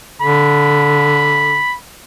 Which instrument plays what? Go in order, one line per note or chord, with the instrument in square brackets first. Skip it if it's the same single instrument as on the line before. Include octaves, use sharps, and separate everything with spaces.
[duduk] D3 [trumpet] B5